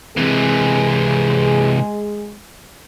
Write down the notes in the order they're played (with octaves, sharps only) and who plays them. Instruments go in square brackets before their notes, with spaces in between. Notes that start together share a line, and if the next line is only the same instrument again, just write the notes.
[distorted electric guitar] C3 E3 [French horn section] G#3 G#4